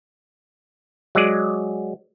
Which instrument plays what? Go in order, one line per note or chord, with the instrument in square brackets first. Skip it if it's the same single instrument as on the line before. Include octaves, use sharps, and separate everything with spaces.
[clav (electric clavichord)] F#3 G#3 G#4 D5